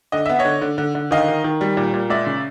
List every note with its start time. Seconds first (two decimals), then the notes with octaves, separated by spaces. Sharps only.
0.12 D3 D#5
0.26 B3 E5
0.39 C#5 D#5
0.45 D3
0.62 D3
0.78 D3
0.95 D3
1.11 D#3 D#5 F5
1.28 D#3
1.44 D#3
1.61 G3
1.77 A#2
1.94 A#2
2.10 G#3 D5 E5
2.27 C#3